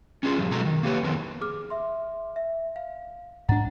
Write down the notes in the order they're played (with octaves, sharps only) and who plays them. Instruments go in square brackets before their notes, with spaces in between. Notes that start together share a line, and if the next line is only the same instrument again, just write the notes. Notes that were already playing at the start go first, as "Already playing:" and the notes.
[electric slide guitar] C#4 D4 F4 G#4
F#2 A2 F3 G3
B2 F#3 G#3 F#4 A4 A#5
D#3
A#3 G4 B4 C#5
F2 D#3 B3 A#4
[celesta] G#4 D6 F6
E5 C6
E5
F5
[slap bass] G#2 D4 [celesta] F#5 A#5 A6